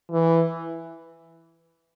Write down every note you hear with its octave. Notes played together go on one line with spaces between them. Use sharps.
E3